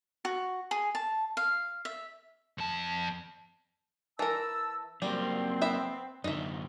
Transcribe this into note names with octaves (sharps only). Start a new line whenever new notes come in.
F#4
G#4
A5
F5
E5
F2 A5
E3 A#4 A5 E6
F#3 G3 A#3 C4
B3 E5 B5
F#2 D3 D#4 E5